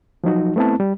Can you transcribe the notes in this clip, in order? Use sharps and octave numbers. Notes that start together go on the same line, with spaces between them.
F3 F#3 D#4 F#4
A3 B3 C4 E4 A5
G3